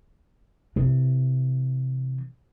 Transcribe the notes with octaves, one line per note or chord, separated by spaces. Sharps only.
C3 E3